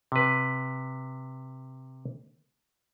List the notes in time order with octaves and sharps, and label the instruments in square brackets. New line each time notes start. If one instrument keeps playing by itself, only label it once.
[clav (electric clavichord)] C3 B4